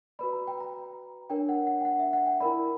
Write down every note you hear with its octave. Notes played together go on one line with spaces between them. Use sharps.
F#4 B4 D5 B5
A#5
G5
A#5
D4 A#4 C#5 G5
F#5
F#5
G5
F#5
E5
F#5
G5
E4 A#4 D5 B5